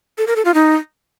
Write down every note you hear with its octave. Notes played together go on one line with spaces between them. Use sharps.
A4
A#4
A4
F4
D#4